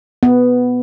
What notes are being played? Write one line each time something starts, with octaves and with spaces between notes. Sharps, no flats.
B3